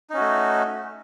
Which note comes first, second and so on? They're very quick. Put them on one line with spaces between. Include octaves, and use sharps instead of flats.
D#4 C#4 F#4 A3